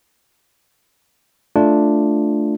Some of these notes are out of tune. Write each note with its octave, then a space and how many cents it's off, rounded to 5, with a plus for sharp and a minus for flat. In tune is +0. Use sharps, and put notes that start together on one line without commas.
A3 +0 D4 +0 F4 +0